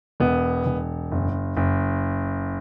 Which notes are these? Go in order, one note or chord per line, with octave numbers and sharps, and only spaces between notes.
E1 B3
E1
F#1
F#1